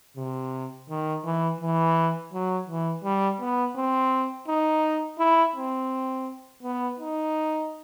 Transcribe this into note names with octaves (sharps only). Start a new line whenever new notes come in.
C3
D#3
E3
E3
F#3
E3
G3
B3
C4
D#4
E4
C4
B3
D#4